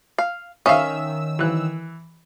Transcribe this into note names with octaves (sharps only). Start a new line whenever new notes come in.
F5
D#3 C#4 E5 F5 D#6 E6
E3 F#6